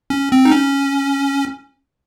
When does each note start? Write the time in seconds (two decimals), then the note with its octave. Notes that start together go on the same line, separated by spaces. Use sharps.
0.10 C#4
0.32 C4
0.45 D#4
0.52 C#4